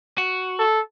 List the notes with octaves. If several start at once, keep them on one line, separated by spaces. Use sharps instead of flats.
F#4
A4